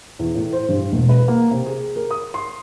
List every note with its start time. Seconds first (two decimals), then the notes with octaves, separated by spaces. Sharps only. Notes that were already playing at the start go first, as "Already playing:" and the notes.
0.19 E2
0.35 A2
0.53 C5
0.69 G2
0.93 E1
1.09 B4
1.28 A#3
1.51 C3
1.66 G#4
1.96 A#4
2.11 D#6
2.34 C6